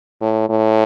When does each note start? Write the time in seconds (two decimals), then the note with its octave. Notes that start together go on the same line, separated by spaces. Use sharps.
0.21 A2
0.49 A2